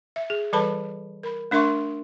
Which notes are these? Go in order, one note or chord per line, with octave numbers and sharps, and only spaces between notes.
E5
G#4
E3 G3 A4 B4 A5 B5
A#4 B5
A3 D4 A#4 E5 C6 C#6